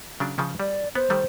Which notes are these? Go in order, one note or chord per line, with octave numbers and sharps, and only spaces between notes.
C#3 F#3 D4
C#3 F3 C#4
G3 D5
B3 C5
D#3 G3 A3